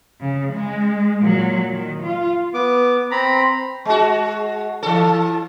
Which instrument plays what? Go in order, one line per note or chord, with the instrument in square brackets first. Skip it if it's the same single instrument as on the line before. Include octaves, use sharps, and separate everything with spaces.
[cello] C#3
G#3
A#2 F#3
D#3
F4
[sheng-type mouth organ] B3 D6
C4 A#5 B5
[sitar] G#3 F#4
E3 A4